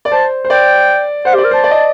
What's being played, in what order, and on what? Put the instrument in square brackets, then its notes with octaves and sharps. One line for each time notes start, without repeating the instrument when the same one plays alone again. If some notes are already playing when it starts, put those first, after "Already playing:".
[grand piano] D5
[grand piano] C5 [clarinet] A5
[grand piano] C5
[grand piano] D5 [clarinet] G5
[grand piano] C5 [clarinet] F#5
[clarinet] G4
[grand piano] D5
[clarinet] A#4
[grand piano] C5 [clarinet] A5
[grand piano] D5
D#5